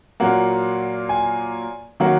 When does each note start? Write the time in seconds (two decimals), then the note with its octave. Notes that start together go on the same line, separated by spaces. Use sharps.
0.20 A#2 F#3 A#3 F#5
1.09 G#5
2.00 D#3 F#3 A#3 F#5